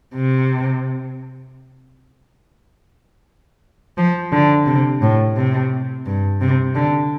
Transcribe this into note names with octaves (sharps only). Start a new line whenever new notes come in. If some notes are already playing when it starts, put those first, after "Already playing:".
C3
F3
D3
C3
A2
C3
G2
C3
D3